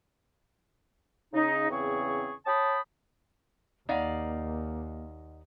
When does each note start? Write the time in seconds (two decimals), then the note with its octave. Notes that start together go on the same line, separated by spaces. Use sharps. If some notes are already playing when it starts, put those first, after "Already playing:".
1.33 C#3 D#4
1.70 E2 C#3 C4 G#4 C#6
2.46 C#5 G5 A5 B5 D#6
3.89 D#2 A#3 D#4 D5 D#5 F5 F#5